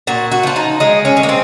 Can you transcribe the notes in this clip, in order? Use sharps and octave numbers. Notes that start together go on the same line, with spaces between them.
A#2 F#4
F#4
F3 F4
D#4
G#3 D#4
C#4
G#3
A#3
C4